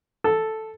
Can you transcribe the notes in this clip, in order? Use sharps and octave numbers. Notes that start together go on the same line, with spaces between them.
A4